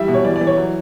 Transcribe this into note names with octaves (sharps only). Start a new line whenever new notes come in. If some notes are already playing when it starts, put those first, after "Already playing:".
Already playing: E3 G3 E5
B2
C#5
E3 D5
D5
E3
C#5
F#3